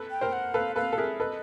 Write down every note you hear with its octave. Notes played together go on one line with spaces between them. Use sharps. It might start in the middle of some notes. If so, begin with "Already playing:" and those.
Already playing: A4 B4
G5
A#4 C5
F#5
A4 B4 F5
A4 B4 F5
A4
G#4 A#4 E5
A4 B4 D#5